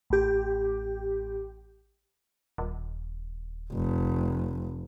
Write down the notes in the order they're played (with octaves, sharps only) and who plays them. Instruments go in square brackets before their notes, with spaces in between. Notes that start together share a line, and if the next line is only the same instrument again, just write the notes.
[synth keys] A1 G4
[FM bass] D#1
[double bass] F1